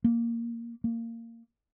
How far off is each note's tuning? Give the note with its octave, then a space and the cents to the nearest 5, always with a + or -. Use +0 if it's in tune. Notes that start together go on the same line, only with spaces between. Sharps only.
A#3 -5
A#3 -20